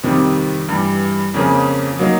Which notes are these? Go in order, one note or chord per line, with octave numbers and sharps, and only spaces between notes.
F2 C3 D#3 G3
G2 E3 G3
F2 C#3 F3 A#3 C#4
F#3 A#3 D#4